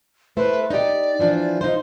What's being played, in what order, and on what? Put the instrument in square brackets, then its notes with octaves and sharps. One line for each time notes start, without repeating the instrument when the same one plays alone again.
[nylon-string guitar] A3 E4 C5 [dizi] B4
[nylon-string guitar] D#4 G4 [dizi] D5
[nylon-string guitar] E3 F3 D4
D#4 F4 C5